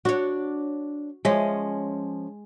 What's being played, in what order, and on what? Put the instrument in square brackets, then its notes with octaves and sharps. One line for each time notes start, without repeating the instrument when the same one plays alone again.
[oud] D4 C#5 [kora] F#4
[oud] F3 C#4 E5 [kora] G#3